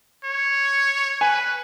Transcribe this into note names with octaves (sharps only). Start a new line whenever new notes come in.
C#5
B4 G#5